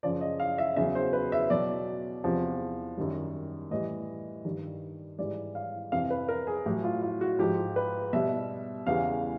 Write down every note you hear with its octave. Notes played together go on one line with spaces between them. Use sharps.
F#2 C#3 F3 D5
D#5
F5
E5
E2 C#3 F#3 E5
C5
B4
E5
B2 F#3 D5
E2 C3 F3
F#2 D#3 G3
A2 E3 G3 D#5
G2 D#3 G3
G#2 E3 G3 D5
F5
F2 C3 E3 F5
B4
A#4
G#4
A2 F#3 G4
F4
F4
F#4
G#2 F3 G4
B4
B2 G3 E5
E2 C#3 E3 G3 F5